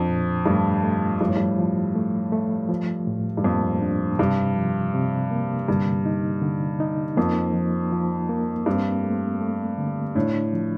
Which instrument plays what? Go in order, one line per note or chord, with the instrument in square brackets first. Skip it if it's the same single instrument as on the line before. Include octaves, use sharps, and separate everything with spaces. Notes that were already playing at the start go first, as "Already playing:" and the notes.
Already playing: [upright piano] F2 [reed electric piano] D4
[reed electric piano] A#2
[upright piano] G2 [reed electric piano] A3
[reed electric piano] A3
[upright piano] G2 [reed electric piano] F3
[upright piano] A2
G2
[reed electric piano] F3
A3
A3
F3
A2
[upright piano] G2
[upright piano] F2 [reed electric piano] A#3
[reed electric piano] D4
[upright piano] G2 [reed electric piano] C3
[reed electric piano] F3
C3
A#3
[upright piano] G2 [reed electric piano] D3
[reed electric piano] D#4
D3
D#4
[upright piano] F2 [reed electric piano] A#3
[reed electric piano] F3
F3
A#3
[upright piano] G2 [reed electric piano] C4
[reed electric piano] A3
A3
D3
[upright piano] A2 [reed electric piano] D4
[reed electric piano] F3